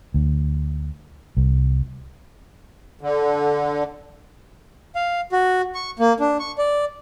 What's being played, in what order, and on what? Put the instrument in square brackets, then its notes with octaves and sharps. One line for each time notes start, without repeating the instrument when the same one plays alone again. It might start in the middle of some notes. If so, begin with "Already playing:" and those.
[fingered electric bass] D2
C2
[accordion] D3
[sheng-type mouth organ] F5
F#4
C#6
A#3
D4
C#6
D5